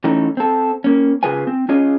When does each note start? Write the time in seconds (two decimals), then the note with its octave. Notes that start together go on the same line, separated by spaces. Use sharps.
0.04 E3 A3 C#4 D#4
0.37 C4 A4
0.84 A#3 C#4
1.23 C#3 F4 G#4 B4 C5 G#5
1.47 C4
1.69 C#4 F4 G#4 C#5 D#5